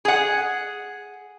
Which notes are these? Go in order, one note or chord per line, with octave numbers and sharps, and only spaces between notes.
G#4 F#5